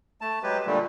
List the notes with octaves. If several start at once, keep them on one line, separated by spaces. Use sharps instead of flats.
A3 A5
F#3 G#3 G4 B4
A#2 D3 G3 A3